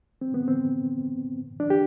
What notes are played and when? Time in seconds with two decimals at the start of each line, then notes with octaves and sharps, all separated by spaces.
0.21 C4
0.34 B3
0.48 C4
1.60 D4
1.70 G4